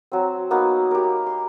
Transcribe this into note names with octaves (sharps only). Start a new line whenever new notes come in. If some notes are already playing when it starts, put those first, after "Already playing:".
F#3 C4
A#3 B3 D#4 F#4
G4 A#4
C6